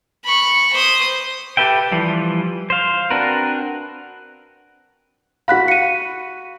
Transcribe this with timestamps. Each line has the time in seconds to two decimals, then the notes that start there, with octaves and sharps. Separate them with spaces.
0.25 B5 C#6
0.74 C5 D#6
1.57 G4 A4 B4 E5 G5
1.92 E3 F3 G3
2.70 C5 F5
3.11 C4 D4 F#4 A#4 B4
5.48 F#4 F5 F#5 B5 F#6 B6
5.68 C#7 D#7